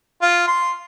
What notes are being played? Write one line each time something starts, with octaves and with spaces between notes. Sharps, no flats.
F4
C6